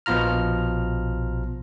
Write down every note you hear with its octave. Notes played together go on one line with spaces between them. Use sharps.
A#1 B2 F3 F4 A#5 F6